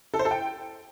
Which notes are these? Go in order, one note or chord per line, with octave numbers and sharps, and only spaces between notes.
A4
C5
A4
G5